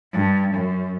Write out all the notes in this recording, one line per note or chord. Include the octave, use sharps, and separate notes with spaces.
G2
F#2